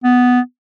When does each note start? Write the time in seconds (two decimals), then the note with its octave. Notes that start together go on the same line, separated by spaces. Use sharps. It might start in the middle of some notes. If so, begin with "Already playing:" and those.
0.04 B3